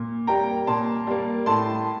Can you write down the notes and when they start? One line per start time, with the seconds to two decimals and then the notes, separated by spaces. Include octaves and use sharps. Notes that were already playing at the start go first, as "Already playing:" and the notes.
Already playing: A#2
0.27 G3 A#3 G5 A#5
0.67 A#2 A5 C6
1.07 G3 A#3
1.46 A2 A5 C6